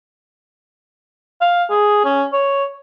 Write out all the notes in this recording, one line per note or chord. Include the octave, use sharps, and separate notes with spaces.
F5
G#4
C#4
C#5